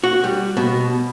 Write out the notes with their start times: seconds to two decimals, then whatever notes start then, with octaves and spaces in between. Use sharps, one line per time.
0.04 F#4
0.24 G3
0.57 B2